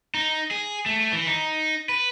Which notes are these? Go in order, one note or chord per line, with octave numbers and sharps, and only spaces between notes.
D#4
G#4
A3
E3
D#4
B4